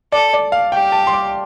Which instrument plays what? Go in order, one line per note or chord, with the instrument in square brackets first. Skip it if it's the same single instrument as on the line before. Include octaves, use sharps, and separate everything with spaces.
[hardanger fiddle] A4 [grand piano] D5
[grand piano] D5
F5
[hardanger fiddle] G4 [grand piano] G5
[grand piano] A5
C6
D6